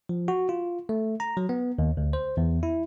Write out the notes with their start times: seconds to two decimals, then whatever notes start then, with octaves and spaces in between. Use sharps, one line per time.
0.09 F3
0.28 F#4
0.49 F4
0.89 A3
1.20 A#5
1.37 F#3
1.49 B3
1.79 D#2
1.97 D2
2.13 C5
2.37 E2
2.63 E4